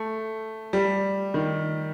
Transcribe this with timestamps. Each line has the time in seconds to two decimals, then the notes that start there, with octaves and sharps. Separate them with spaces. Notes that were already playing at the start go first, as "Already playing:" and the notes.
Already playing: A3
0.73 G3
1.34 D#3